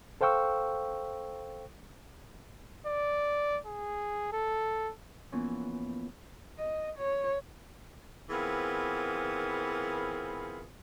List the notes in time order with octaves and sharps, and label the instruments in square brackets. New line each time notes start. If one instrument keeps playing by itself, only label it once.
[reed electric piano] A4 C5 F5 G5 C#6 E6
[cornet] D5
G#4
A4
[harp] E3 F3 A#3 B3 C#4
[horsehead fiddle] D#5
C#5
[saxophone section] E3 B3 C4 F4 G#4 A#4